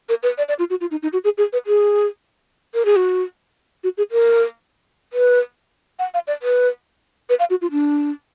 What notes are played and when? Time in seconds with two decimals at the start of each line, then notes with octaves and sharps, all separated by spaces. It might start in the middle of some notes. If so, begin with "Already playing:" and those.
0.09 A#4
0.23 B4
0.38 D5
0.48 D5
0.59 F4
0.70 F#4
0.81 F4
0.91 D#4
1.02 D#4
1.13 F#4
1.24 G#4
1.38 G#4
1.53 B4
1.67 G#4
2.74 A#4
2.85 G#4
2.96 F#4
3.84 F#4
3.97 G#4
4.12 A#4
5.13 B4
5.99 F#5
6.14 F5
6.27 D5
6.42 B4
7.29 B4
7.39 F5
7.50 F#4
7.62 F4
7.71 D4